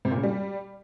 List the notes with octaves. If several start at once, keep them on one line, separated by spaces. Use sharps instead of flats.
C3
A#2
C#3
G3